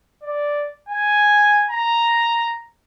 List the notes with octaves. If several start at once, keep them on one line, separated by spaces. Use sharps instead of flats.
D5
G#5
A#5